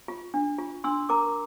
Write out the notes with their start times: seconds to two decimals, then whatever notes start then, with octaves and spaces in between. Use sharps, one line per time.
0.08 F4
0.34 D4
0.59 F4
0.84 D4 C6 E6
1.09 A#4 A#5 D6